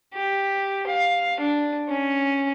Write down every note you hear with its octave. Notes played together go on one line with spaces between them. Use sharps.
G4
F5
D4
C#4